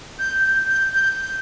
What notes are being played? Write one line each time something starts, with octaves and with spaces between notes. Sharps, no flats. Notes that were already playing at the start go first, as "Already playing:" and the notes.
G6
G6
G6
G6
G6